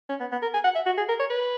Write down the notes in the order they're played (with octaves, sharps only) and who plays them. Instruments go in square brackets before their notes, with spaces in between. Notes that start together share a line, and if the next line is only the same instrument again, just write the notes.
[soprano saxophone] C#4
B3
B3
A#4
G#5
F#5
E5
F#4
G#4
A#4
C#5
B4